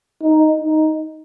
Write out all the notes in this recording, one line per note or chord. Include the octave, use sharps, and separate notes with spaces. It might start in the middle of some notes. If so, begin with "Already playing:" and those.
D#4
D#4